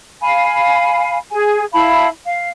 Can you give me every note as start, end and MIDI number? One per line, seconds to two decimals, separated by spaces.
0.22 1.18 77
0.22 1.18 80
0.22 1.18 83
1.31 1.65 68
1.31 1.65 80
1.73 2.08 64
1.73 2.08 77
1.73 2.08 81
1.73 2.08 83
2.26 2.49 77